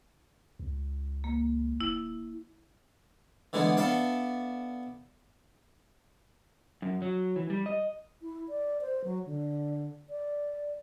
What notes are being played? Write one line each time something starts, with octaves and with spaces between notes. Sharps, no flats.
C#2
A#3
D#1 E4
D3 E3 G#3 B3 D4
B3 D4 A4 E5 F5 A5
F#2
F#3
E3
G3
D#5
E4
D5
C5
F#3
D3
D5